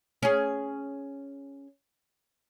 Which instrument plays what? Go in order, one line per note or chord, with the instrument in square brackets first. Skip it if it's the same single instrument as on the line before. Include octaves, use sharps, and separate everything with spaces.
[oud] C#4 G#4